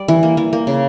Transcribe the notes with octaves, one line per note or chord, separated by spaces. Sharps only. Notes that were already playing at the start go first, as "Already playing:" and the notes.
Already playing: G3 D5
E3
A#3
E3
A#3
C#3